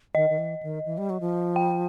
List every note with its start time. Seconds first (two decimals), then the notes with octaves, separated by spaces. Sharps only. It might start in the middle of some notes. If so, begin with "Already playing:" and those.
0.15 D#3 D#5
0.30 D#3
0.38 E3
0.63 D#3
0.85 E3
0.98 G3
1.10 F#3
1.20 F3
1.56 G5